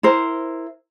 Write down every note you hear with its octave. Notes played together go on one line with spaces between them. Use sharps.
E4 A#4 C5